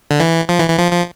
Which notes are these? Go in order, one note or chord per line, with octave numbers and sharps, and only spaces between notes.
D3
E3
F3
E3
E3
F3
F3